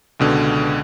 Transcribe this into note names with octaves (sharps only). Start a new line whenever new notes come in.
C#2 B2 D3